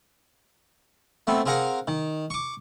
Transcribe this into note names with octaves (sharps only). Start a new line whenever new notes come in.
A3 B3 C4
C4 G#4 A#4 F5 F#5 A#5
D#3
C#6 D6